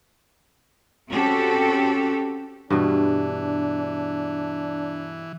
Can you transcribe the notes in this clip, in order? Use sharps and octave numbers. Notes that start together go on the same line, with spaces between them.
C4 C#4 F#4 G4 A4
G2 B2 E3 D4